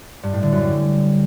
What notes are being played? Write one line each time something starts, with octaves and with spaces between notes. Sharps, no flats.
G2
A2
D3
F#2
G3